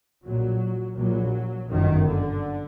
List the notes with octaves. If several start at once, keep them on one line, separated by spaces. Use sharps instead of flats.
A#1 A#2 F#3
A#1 A#2 F#3
G1 F#2 D#3
D3